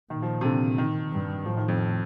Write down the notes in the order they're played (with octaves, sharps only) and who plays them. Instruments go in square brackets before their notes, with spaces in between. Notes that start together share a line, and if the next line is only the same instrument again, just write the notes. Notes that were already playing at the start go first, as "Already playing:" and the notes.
[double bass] A#2 [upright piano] D#3
[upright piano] F3
C3
D3
D#3
[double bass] G2
[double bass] A2 [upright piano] F3
[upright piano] D#3
F2